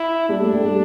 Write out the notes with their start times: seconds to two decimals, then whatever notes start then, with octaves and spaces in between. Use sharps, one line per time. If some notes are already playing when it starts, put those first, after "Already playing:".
Already playing: E4
0.29 G3 D4 G4
0.41 A3 A4
0.53 G3 G4
0.64 G3 G4